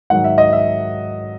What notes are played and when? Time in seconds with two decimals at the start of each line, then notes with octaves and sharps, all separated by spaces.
0.10 G#2 D#3 F#3 F#5
0.24 E5
0.38 D#5
0.53 E5